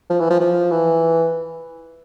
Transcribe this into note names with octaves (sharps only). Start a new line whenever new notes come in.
F3
E3
F3
F3
E3